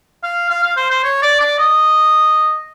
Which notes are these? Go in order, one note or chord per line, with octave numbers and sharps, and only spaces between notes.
F5
F5
F5
C5
C5
C#5
D5
D5
D#5